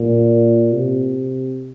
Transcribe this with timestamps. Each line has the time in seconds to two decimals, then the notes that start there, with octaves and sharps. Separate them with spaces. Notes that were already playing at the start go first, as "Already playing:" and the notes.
Already playing: A#2
0.72 C3